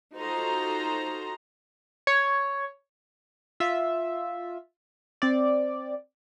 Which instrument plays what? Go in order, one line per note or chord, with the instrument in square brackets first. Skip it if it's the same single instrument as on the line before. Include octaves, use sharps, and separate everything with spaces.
[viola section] D#4 F4 F#4 A4 C5 A#5
[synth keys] C#5
F4 E5
C4 D5